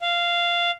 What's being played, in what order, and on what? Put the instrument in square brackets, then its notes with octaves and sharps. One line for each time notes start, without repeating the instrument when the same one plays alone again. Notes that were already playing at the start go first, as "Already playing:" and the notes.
[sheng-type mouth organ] F5